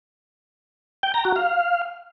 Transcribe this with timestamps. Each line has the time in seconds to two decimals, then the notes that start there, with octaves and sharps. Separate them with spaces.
1.03 G5
1.14 A#5
1.25 F#4
1.36 F5